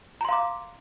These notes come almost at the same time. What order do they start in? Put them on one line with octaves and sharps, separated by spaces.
A#5 C6 F5 D6